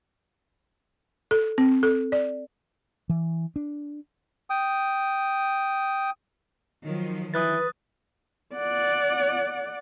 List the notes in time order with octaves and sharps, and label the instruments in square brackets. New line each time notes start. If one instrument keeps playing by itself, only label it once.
[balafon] A4
C4
A4
D5
[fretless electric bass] E3
D4
[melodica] G5 D#6
[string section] D#3 F3 F#3
[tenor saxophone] E3 [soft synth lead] B4 [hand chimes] D#6 F#6 A6
[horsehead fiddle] D5 F#5